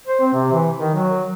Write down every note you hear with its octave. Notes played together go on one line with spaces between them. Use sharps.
C5
C4
C3
E3
D#3
F#3